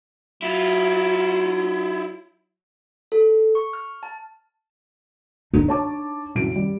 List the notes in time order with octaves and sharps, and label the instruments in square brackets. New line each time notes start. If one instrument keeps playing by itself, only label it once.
[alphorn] F#3 [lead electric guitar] E4 F4
[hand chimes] A4
C#6
F6
A5
[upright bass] D4 D#4
[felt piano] C#5 A5 D6
C2 F#2 D7
G3